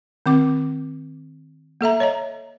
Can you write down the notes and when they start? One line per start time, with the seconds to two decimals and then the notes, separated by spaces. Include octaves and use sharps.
0.26 D#3 C4 D6
1.81 A#3 A4 E5 A#5
2.00 C#5 D#5 A#5